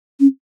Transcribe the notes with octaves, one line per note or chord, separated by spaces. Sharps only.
C#4